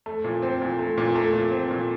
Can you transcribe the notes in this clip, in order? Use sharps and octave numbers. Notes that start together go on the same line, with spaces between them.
A3
A#2
C4
A#2
A3
A#2
A3
A#2
C4
A#2